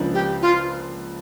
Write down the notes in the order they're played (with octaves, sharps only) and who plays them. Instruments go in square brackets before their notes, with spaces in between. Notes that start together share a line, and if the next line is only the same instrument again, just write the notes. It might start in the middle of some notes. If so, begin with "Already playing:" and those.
Already playing: [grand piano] C#2 C#3 F3 A#3 D4
[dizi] G4
F4